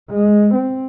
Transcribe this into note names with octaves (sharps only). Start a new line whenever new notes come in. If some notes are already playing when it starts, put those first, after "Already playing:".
G#3
C4